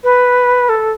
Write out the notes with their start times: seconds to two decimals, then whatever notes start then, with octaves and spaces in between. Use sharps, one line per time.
0.04 B4
0.69 A4